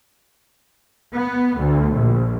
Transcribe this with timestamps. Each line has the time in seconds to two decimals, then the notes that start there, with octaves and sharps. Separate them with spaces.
1.15 B3
1.59 D2
1.96 A#1